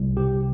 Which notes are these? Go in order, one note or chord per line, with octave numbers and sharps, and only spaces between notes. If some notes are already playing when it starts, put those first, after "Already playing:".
Already playing: C2
C3 G4